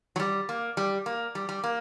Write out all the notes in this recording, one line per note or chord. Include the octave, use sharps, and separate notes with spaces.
F#3
G3
A#3
G3
A#3
G3
G3
A#3